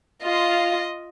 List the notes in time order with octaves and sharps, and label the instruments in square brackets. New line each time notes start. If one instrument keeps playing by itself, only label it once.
[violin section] F4 [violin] D#5